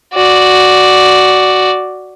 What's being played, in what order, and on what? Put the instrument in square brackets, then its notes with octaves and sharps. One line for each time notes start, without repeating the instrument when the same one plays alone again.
[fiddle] F#4 D5